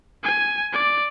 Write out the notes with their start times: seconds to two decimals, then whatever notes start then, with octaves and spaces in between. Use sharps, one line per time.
0.23 G#5
0.73 D5